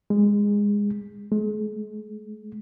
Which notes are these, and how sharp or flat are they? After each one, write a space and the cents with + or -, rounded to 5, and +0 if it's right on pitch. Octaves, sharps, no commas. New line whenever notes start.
G#3 -20
G#3 +35